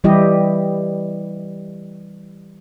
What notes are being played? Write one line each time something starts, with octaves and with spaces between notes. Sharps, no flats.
E3 G3 E4 G4 D#5